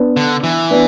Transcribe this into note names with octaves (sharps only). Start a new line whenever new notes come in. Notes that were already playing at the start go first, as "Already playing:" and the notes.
Already playing: B3 D4
D3
E3
B3 D4